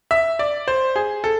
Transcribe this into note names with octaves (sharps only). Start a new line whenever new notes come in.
E5
D5
C5
G#4
A4